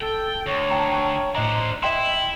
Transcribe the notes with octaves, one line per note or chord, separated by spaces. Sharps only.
A4 G5
D2 C#5
G5 A5 A#5
A2 D4 C5 D#5 A#5
E4 D#5 E5 G5 C6